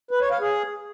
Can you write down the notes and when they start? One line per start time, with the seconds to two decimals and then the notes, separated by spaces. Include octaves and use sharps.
0.11 B4
0.21 C#5
0.31 F5
0.41 G#4